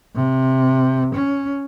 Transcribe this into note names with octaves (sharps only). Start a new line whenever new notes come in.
C3
C#4